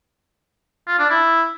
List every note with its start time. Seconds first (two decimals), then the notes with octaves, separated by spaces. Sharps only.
0.88 F4
0.99 D4
1.10 E4